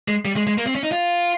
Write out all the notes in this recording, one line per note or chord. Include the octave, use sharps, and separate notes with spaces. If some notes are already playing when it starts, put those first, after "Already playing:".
G#3
G3
G#3
G#3
A#3
C4
C#4
D#4
F4